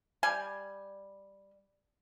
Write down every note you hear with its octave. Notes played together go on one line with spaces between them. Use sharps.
G3 G#5